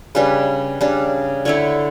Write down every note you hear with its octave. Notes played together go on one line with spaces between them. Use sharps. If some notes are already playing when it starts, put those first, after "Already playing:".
C#3 G3 D4 B4
C#3 G3 D4
D3 A3 E4 C#5